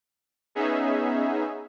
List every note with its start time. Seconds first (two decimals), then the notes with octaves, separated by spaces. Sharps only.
0.55 B3 C#4 D#4 G#4 E5